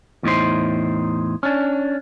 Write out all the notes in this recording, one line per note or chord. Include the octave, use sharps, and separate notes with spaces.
E2 A2 D#4 C5
C#4 D4